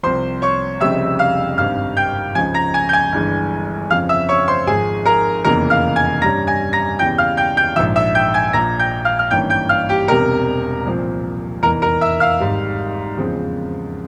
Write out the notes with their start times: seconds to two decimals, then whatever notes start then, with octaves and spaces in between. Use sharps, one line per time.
0.03 C2 C3 F3 C5 C6
0.42 C#5 C#6
0.80 F1 F2 C#3 G3 C4 E5 E6
1.19 F5 F6
1.58 G#1 G2 G3 C4 F5 F6
1.97 G5 G6
2.35 C#2 C#3 F3 G#5 G#6
2.54 A#5 A#6
2.74 G#5 G#6
2.89 G6
2.93 G#5 G#6
3.12 G1 G2 E3 G#3
3.90 F2 C#3 F3 C4 F5 F6
4.09 E5 E6
4.29 C#5 C#6
4.48 C5 C6
4.67 G#1 G#2 F3 G#4 G#5
5.06 A#4 A#5
5.44 F1 E2 C#3 E3 A#3 A#4 A#5
5.70 F5 F6
5.96 G#5 G#6
6.22 G2 G3 C#4 A#5 A#6
6.47 G#5 G#6
6.73 A#5 A#6
6.99 E2 C#3 E3 G3 G5 G6
7.18 F5 F6
7.37 G5 G6
7.57 G5 G6
7.76 A#1 G#2 F3 E5 E6
7.96 E5 E6
8.15 G5 G6
8.34 G#5 G#6
8.53 A#1 A#2 F3 A#5 A#6
8.79 G5 G6
9.05 F5 F6
9.19 F6
9.31 G#1 G2 E3 A#3 C#4 G5 G6
9.50 G5 G6
9.69 F5 F6
9.89 G4 G5
10.08 E1 E2 C3 G3 A#4 A#5
10.85 C2 A#2 F3 C4
11.63 F1 E2 E3 A#4 A#5
11.82 A#4 A#5
12.01 E5 E6
12.20 F5 F6
12.40 G#1 G#2 G3
13.17 E2 C#3 F3 G#3 C4